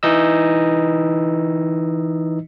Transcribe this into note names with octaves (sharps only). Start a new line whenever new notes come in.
E3 D#4 D#5 E6